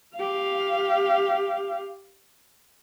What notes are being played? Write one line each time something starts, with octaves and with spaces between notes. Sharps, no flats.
G4 F5